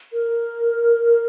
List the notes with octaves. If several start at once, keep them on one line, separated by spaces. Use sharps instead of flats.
A#4